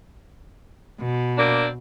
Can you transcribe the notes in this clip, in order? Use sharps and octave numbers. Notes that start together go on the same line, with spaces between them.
B2
A#3 C4 D4